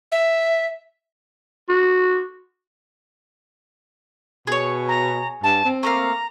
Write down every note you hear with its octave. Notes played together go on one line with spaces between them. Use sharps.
E5
F#4
B2 G#4 C#5
A#5
G2 A5
C4
A3 A#3 F5 A#5